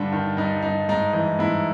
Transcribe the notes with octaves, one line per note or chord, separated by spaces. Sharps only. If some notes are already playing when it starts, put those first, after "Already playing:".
Already playing: G2 D3 D4
D#3
G2 D#4
G2 D#4
G#2 D#4
E3 D#4
G#2 E4